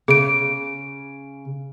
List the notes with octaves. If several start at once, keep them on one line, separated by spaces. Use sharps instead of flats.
C#3 G#4 D7